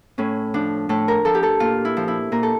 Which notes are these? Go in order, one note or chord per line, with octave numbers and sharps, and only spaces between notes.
A2 C#4
F3 D4
A2 A4
A#4
F3 A4
G4
A4
A#2 F4
E4
F3
E4
A#2 A#4
A4